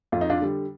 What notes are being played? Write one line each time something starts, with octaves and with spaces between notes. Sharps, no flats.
F2 F4
D#4
D4 F4
D3 G3